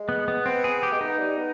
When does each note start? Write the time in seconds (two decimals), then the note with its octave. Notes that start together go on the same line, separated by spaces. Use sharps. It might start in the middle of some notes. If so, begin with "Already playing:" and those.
Already playing: G#3
0.09 B3
0.28 B3
0.46 B3 C4
0.64 G#4
0.83 G4
0.93 G#3
1.00 B3 D#4
1.18 G3
1.37 B3